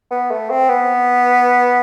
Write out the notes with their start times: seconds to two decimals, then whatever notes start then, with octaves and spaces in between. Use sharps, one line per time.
0.11 B3
0.31 A3
0.50 C4
0.69 B3